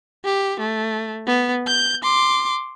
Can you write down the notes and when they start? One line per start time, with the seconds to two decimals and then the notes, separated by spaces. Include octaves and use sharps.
0.25 G4
0.60 A3
1.27 B3
1.67 G6
2.03 C6 D6